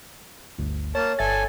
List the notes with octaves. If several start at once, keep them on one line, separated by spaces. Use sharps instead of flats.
G1 D2
A#3 C#5 A5
G1 A4 E5 G#5 A6